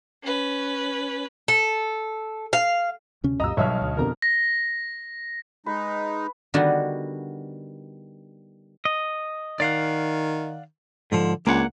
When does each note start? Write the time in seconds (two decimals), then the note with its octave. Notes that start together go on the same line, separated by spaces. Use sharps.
0.23 C#4 B4
1.48 A4
2.53 F5
3.24 D2 C3 C#4
3.40 C2 F#2 A#2 D#5 A#5 E6
3.57 B1 F#3 G3 C#5 D#5 E5 F6
3.82 D2
3.97 F2 B2 D3 A#4 A#5
4.22 A#6
5.66 G#3 D#4 B4
6.54 D3 D#3 G3 B3 D4 F#4
8.85 D#5
9.60 D#3 D5 F5 F#5
11.12 G#2 D3 F3
11.47 C#2 A#3 D4 F#5